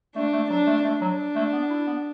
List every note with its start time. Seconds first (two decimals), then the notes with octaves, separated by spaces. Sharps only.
0.15 A3 D4
0.33 A3
0.50 F#3 D4
0.67 A3
0.84 A3 D4
1.01 F#3
1.35 A3
1.53 B3
1.70 E4
1.87 B3